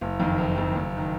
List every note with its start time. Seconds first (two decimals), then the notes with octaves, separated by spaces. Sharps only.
0.01 F#1
0.20 F2 D#3
0.38 F#1
0.57 F2 D#3
0.76 F#1
0.97 D#3